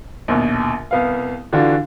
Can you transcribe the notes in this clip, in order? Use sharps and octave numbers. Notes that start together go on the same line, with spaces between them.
A#1 D#2 B2
C2 B3 F5
D3 E3 D4 F4 F#4